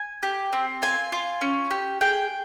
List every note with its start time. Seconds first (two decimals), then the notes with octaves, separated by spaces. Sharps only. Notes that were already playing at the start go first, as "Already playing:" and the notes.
Already playing: G#5
0.23 G4
0.53 C4
0.82 F4 G#5
1.12 F4
1.41 C#4
1.71 G4
2.01 G#4 G5